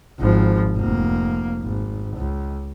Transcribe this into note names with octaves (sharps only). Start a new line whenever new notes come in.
G#1 F3
F1 A#3
G#1
C#2